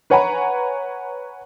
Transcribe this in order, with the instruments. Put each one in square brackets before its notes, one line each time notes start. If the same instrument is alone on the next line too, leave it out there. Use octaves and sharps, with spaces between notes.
[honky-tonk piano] B4 C#5 F#5 G#5 A#5 B5